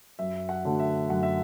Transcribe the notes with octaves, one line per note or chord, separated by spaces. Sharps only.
F#2 E5
F#5
D3 F#3 A3
E5
F#2 F#5
E5